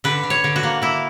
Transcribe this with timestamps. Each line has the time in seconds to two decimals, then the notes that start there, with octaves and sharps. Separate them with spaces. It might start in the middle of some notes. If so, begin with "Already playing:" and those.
0.04 D3 B4
0.23 D3
0.30 C#5
0.44 D3
0.56 F#4
0.63 A#3
0.82 A#3 E4